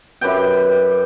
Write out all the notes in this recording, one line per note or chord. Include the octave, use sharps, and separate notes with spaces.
F#2 G4 B4 G5